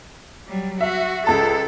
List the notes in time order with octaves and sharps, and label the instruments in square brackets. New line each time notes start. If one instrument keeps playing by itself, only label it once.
[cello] F#3 G3
[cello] F#4 [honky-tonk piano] E5
[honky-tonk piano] C#2 A5 [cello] A4